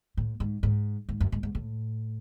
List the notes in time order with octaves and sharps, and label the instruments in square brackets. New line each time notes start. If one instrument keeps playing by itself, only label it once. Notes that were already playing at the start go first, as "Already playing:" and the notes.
[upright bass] A2
G#2
G#2
G#2
F#2
G#2
G#2
A2